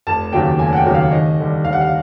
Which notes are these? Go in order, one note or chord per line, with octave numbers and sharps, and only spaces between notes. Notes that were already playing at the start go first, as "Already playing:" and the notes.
F1 A5
D#2 C#3 F#3 A#3 G5
F1 G#5
F#5
G5
D#2 C#3 F#3 A#3
F5
D#2 D#5
D3 G3
D#2 F5
F#5
F5